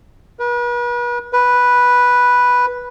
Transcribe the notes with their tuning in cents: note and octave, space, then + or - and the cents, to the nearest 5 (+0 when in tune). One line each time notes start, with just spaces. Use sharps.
B4 -40
B4 -5